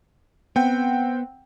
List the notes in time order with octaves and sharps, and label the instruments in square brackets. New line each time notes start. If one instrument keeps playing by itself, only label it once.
[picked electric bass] B3 [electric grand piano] C4 F#5 G5